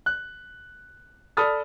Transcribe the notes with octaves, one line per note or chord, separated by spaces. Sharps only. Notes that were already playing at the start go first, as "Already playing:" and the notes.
F#6
A4 D5 B5 D#6 F6 A6